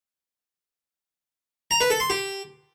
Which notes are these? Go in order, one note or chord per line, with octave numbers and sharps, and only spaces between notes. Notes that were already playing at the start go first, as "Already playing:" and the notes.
A#5
B4
A4
C6
G4